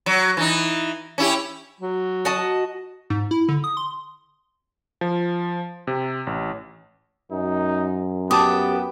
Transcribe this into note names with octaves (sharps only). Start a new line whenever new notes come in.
F#3
E3 D#4
C#4 E4 G4
F#3
F#4 D#5 A5
G#2
E4
D3
D#6
C6
F3
C3
A1
F#2 D#4
B3 G4 A5 D6 D#6